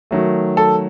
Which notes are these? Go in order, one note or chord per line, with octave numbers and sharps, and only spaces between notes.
D#3 F#3 A3
A4 A5